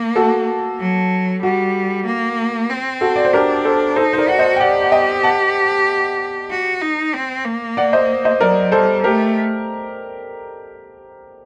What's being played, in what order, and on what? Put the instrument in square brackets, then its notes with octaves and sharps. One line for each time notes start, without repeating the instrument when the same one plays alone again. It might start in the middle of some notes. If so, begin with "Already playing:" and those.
Already playing: [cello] A#3
[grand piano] F#4 A4
[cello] F#3
[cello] G3 [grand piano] F#4
[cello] A#3
C4
[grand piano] F#4 A4
D5
C5
[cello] D4 [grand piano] G4 A#4
[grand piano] A4 C5
[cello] D#4 [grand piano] A4 C5
[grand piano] C5
A#4 D5
[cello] F#4 [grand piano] F#5
[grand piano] C5 D#5
G5
[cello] G4 [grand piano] D5 F#5
[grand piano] F#5
D#5 G5
F#5 A5
[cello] F#4
D#4
C4
A#3
[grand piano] D5 F#5
C5 D#5
C5 D#5
[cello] F#3 [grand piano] A#4 D5
[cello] G3 [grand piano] A4 C5
[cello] A3 [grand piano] G4 A#4